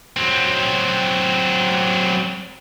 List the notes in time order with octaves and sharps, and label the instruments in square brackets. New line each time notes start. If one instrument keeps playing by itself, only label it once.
[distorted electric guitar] F#3 C4